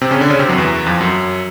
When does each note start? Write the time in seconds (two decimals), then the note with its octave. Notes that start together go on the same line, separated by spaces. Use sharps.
0.01 C3 C4
0.11 C#3 C#4
0.20 D3 D4
0.30 C#3 C#4
0.39 C3 C4
0.49 F#2 F#3
0.58 E2 E3
0.86 F2 F3
1.01 F#2 F#3